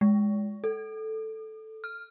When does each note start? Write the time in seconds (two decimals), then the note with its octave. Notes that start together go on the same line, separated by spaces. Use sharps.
0.01 G#3
0.64 A4
1.84 F6